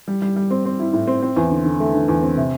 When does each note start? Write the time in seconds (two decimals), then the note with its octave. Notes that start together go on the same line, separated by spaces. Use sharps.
0.08 G3
0.22 G3
0.36 G3
0.51 C4
0.65 C4
0.79 E4
0.93 A2
1.08 C4
1.22 C4
1.37 E2
1.51 D3
1.65 D3
1.80 A3
1.95 D3
2.08 E2
2.23 C4
2.37 C3